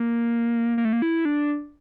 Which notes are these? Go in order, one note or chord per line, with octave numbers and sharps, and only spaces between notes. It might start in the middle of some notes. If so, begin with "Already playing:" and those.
Already playing: A#3
A#3
A3
A#3
E4
D4